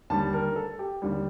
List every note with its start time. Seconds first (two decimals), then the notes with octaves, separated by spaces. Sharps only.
0.10 D#2 D3 G3 A5
0.33 A#4
0.56 A4
0.79 G4
1.02 D#2 D3 G3